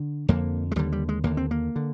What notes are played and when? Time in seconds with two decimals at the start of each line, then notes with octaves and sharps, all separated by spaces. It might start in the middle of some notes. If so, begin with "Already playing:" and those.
Already playing: D3
0.28 F2 D3 A#3
0.72 G#3
0.76 D#2 D3 G3
0.92 G3
1.09 G#3
1.24 D#2 D3 A#3
1.37 C4
1.51 A#3
1.76 D3